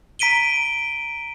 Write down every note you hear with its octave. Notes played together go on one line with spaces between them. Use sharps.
A#5 B6 D7 D#7 G7